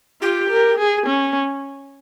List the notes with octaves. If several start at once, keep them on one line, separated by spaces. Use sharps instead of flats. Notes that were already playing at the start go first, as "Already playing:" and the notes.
F4 G4
A#4
G#4
C#4